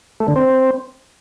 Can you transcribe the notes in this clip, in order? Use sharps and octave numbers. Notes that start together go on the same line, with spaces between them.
A3
D3
C4